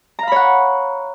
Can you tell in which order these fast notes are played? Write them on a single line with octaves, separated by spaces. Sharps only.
A#5 F5 B5 C#5 F#5